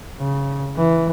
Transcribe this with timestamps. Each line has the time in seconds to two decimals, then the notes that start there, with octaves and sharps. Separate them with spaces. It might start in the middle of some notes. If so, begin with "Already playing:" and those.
0.19 C#3
0.76 E3